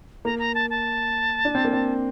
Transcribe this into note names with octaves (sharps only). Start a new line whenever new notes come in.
A#3 A#5
A#5
A5
A5
D4
C4
A#3
C4